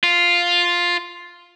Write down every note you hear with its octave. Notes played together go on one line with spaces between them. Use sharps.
F4